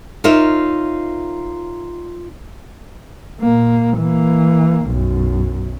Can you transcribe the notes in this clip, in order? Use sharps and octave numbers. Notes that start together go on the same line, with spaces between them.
D#4 F4 A#4 C#5 E5
A#2 A#3
E3 A#3
B1 F#2